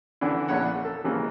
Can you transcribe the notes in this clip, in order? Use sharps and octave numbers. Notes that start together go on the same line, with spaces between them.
D3 E3 C#4 D4 E4
A#1 E2 C#5 F#5 B5
A4
C#3 E3 G#3 A#3